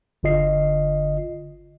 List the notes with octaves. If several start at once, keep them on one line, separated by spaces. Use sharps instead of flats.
G1 D3 F4 D#5 C7